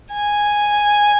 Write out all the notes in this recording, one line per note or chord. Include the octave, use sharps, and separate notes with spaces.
G#5